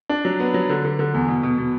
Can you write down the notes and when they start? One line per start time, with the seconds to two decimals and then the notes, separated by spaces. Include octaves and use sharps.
0.09 D4
0.25 F#3
0.40 B3
0.54 F#3
0.69 D3
0.85 D3
0.99 D3
1.14 E2
1.28 B2
1.43 B2
1.58 B2